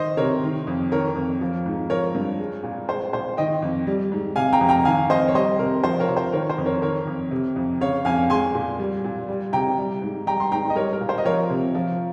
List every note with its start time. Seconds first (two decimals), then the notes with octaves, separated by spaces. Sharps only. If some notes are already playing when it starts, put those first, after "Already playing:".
Already playing: D#3 C5 D#5
0.17 C3 A#4 C#5
0.43 D#3
0.67 F2
0.92 D#3 A#4 C#5
1.16 F2
1.41 F3
1.66 G#2
1.90 F3 A#4 C#5
2.15 G2
2.39 G#3
2.63 A#2
2.89 G#3 C5
3.13 A#2 C5
3.37 D#3 D#5 G5
3.62 F2
3.87 G3
4.12 G#2
4.36 C3 F5 G#5
4.53 G5 A#5
4.61 F2
4.69 G5 A#5
4.85 D#3 F5 G#5
5.10 F2 C5 D#5
5.28 C#5
5.34 G3 C5 D#5
5.59 C3 A#4
5.84 F3 C5
6.00 A#4 C#5
6.09 C3
6.17 C5
6.33 D#3 A#4 C#5
6.49 C5
6.58 F2
6.66 A#4 C#5
6.82 D#3 A#4 C#5
7.07 F2
7.31 C3
7.56 F2
7.81 C#3 C#5 F5
8.05 F2 F5 G#5
8.30 G#3 G#5 C6
8.55 A#2
8.79 G3
9.04 A#2
9.28 G3
9.53 C3 G5 A#5
9.78 G3
10.02 G#2
10.27 G3 G5 A#5
10.40 C6
10.52 G#2 G5 A#5
10.70 D#5
10.75 G3 A#4 C#5
10.93 A#4
11.01 A#2
11.09 C5
11.18 D#5
11.25 F3 A#4 C#5
11.50 C3
11.75 F3